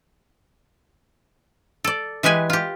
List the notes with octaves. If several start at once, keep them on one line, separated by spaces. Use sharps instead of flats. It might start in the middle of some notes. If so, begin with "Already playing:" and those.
A4 D5
E3 G#3 G4 B4 G#5
F4 G4